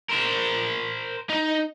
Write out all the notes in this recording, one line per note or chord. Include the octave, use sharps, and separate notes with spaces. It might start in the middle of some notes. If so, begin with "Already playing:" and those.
A#4 C5
D#4